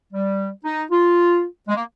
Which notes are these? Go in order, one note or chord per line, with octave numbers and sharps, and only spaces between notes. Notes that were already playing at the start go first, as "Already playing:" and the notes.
G3
D#4
F4
G#3
A#3